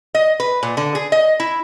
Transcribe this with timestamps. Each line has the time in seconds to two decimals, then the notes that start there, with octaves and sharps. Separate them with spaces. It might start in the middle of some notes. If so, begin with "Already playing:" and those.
0.15 D#5
0.40 B4
0.63 A#2
0.77 D3
0.95 G#4
1.12 D#5
1.40 E4